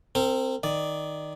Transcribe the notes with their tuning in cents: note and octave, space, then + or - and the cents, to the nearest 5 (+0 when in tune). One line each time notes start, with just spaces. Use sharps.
C4 +0 A#4 -35
D#3 +0 D5 +0